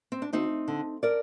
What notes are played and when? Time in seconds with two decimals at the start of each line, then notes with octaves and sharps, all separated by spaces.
0.12 C4
0.22 D4
0.33 D2 C4 D#4
0.68 D3
1.03 A#4 D5